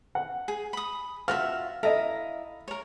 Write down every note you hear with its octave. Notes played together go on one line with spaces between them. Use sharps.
F#5
G#4
B5 D#6
F4 F#4 E5 F6
E4 A4 D#5 F5 A#5
A#4 C#5